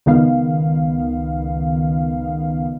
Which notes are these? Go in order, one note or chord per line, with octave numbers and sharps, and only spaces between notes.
C#2 D#3 B3 F5